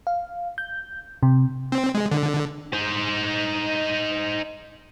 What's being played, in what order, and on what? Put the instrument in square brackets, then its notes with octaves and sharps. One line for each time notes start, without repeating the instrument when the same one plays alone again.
[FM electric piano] F5
G6
C3
[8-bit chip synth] C4
G#3
D3
[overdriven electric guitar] D#4 C5